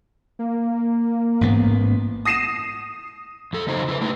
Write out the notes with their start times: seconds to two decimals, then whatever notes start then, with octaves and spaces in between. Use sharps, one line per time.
0.39 A#3
1.41 A1 G#2 B3
2.25 D#6 A#6 C7 D#7 E7
3.53 F2 A4
3.67 E2 C#3 F#3 D#4 C5
3.88 E4 G4 B4
4.01 A3 D4 D#4 B4